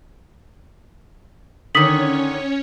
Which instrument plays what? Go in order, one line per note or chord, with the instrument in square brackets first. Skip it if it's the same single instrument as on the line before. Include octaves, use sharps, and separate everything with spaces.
[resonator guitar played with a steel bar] D3 D#3 [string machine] C#4 C#5 [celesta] D#6 B6 F#7